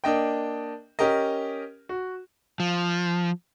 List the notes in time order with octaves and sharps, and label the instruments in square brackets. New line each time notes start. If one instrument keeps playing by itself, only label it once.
[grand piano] A#3 D4 D#5 G5
C#4 G4 A#4 D#5
F#4
[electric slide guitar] F3